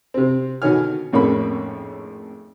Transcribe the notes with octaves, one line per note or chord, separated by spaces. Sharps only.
C3 C4
B2 D3 D#3 C#5 G#5 F6
G#1 F2 A2 A#3 C#4 B5